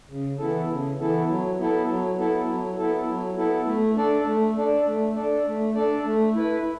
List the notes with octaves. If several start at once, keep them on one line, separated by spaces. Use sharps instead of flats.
C#3
E3 B3 E4 A4
C#3
E3 B3 E4 A4
F#3
B3 E4 A4
F#3
B3 E4 A4
F#3
B3 E4 A4
F#3
B3 E4 A4
A3
D4 A4 D5
A3
D4 A4 D5
A3
D4 A4 D5
A3
D4 A4 D5
A3
E4 B4